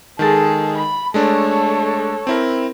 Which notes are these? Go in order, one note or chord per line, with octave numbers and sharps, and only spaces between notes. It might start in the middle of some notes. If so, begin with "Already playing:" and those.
D#3 G#3 G#4 A4 A6
B5
G#3 A3 D4 A4 C#5
C4 E4 A#4